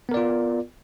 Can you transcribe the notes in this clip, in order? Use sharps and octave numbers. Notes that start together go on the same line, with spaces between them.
B3 F4 A#4 D5